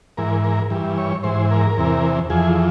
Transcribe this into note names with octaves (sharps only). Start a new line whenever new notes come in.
G#2 E3 A#4
A#4
G2 E3
C#5
G#2 E3 C5
A#4
E2 C3 E3
F2 E3 G#4